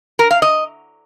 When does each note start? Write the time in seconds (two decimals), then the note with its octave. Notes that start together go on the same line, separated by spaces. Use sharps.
0.19 A#4
0.31 F5
0.42 D#5